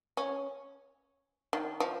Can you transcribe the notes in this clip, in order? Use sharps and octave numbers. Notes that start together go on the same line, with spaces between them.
C#4
D#3
F3